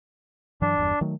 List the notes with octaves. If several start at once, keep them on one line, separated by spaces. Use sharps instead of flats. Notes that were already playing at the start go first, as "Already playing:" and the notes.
G2 E3 F#3 D4
G1 E2 G2
D#3 F#3 A3